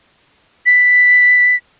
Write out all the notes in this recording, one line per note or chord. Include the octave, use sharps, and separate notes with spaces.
B6